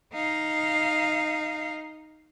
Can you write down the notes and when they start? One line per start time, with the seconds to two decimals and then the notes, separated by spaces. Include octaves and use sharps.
0.14 D#4 F5